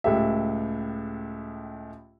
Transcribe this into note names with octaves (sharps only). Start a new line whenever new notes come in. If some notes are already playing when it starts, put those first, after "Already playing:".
C#2 A2 G4 E5